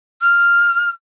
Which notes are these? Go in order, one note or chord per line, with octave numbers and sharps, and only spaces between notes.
F6